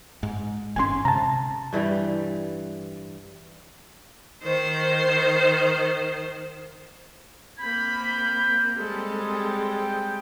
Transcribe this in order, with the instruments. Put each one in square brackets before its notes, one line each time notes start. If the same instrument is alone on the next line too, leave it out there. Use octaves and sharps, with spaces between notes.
[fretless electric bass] G#2
[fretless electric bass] G1 G#2 C#4 [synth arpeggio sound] G#5 C6
[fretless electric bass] C3 [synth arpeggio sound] A5 A#5
[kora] G2 E3 G3
[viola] D#3 C5
[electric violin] A#3 C4 [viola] B5 [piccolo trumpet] G6
[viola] G3 G#3 [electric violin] C4 A4
[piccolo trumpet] G5